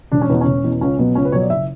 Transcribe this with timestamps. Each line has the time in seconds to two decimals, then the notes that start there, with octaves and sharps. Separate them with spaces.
0.12 E1 D4
0.21 C#4
0.29 E2 B2 B3
0.41 C#4
0.47 E1
0.64 E2 B2
0.81 C#2 C#4
0.99 B2 F#3 B3
1.15 C#2 C#4
1.25 B4
1.32 B2 F#3 C#5
1.42 D5
1.50 F#1 E5